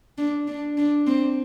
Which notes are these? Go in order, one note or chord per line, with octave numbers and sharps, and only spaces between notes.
D4
D4
D4
C4